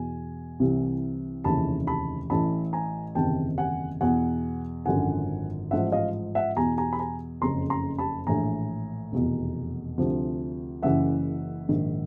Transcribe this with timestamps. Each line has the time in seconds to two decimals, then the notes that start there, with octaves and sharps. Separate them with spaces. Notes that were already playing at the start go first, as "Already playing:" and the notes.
Already playing: E2 B2 G#5
0.60 C2 C3 E3
1.44 F1 D#2 C#3 E3 A5 B5
1.87 A5 B5
2.30 A1 A2 E3 A5 B5
2.73 G#5 A#5
3.15 F#1 E2 C3 D#3 G5 A5
3.58 F#5 G#5
4.01 E2 B2 F#5 G#5
4.86 G#1 F#2 D3 F3 F#5 G#5
5.71 A1 G#2 F3 E5 F#5
5.92 D#5 F5
6.35 E5 F#5
6.56 E2 B2 G#5 A#5
6.78 G#5 A#5
6.93 B5
6.99 G#5 A#5
7.42 F#1 F2 C#3 A#5 C6
7.70 A#5 C6
7.98 A5 B5
8.27 A#1 A2 E3 G#5 A#5
9.12 F1 E2 B2
9.98 D2 C3 F3
10.82 F#1 F#2 C#3 E3 E5 F#5
11.69 A#1 G#2 D#3